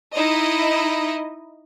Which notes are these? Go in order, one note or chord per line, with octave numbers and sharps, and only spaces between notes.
D#4 E4 D#5